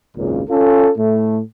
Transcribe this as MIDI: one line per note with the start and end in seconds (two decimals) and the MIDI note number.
0.17 0.42 32
0.17 0.42 37
0.17 0.42 42
0.17 0.42 46
0.17 0.42 49
0.50 0.90 61
0.50 0.90 65
0.50 0.90 69
0.98 1.40 45
0.98 1.40 57